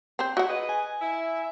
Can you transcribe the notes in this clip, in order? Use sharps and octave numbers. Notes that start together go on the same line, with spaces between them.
C4 C5
E4 F#4 D#5 E5 F#5
G#4 B4 D#5
G#5
E4 E5